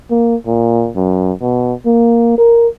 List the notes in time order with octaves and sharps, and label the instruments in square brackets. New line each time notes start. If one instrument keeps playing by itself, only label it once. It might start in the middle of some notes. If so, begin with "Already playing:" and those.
[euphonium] A#3
A#2
F#2
B2
A#3
A#4